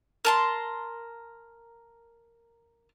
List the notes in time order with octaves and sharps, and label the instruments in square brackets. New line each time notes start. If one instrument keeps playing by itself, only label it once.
[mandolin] A#4 A5 C6